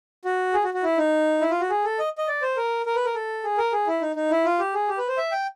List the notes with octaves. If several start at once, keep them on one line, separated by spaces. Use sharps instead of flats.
F#4
G#4
F#4
F#4
E4
D#4
E4
F4
F#4
G#4
A4
D#5
D#5
D5
C5
A#4
A#4
B4
A#4
A4
G#4
A#4
G#4
E4
D#4
D#4
E4
F4
G4
G#4
G4
B4
C5
E5
G5